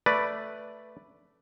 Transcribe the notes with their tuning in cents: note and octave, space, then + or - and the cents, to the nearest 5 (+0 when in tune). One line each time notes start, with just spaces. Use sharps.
A3 +0 B4 +0 D5 +0